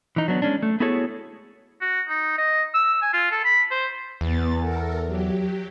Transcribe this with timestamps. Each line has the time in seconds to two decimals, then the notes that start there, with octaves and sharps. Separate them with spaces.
0.16 E3 D#4
0.28 F#3 B3 D4
0.42 G#3 C#4 D4
0.63 A3
0.80 B3 E4 F#4 G#4 A4 C#5
1.81 F#4
2.08 D#4
2.38 D#5
2.74 E6
3.02 G#5
3.13 F4
3.31 A4
3.45 B5
3.71 C5
4.21 E2 B3 A6
4.60 A4 A#4
5.06 F#3 G4